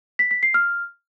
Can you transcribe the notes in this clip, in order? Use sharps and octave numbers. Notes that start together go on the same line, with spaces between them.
B6
B6
C7
F6